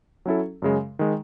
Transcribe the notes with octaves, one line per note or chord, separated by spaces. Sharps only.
F#3 C#4 E4 A4
F#2 C#3 G#3
D#3 G#3